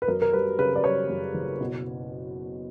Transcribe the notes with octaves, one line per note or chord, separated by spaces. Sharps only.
B4
F#2 A#4
A#4
G3 B4
C#3 B4
D5
G3 C#5
F#2
F#1
B2